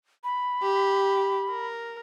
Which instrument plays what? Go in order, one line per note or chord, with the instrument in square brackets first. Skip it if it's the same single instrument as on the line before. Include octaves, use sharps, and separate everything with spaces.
[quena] B5
[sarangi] G4
A#4